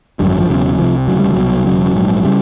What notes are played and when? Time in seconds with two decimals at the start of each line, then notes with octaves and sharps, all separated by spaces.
0.19 G#1 F#2 D3 G3
0.29 F#3
0.40 F3
0.49 E1 E2 C#3 F#3
0.78 C2 C3 F3
1.07 E1 D2 C#3 F#3
1.19 G3
1.32 C2 B2 F#3
1.66 E1 D2 C#3 F#3
1.94 A#1 G#2
2.24 C#3 G3